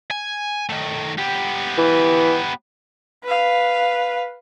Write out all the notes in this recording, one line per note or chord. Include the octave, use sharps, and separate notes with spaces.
G#5
D#3 A3
B3 G4
E3
B4 F5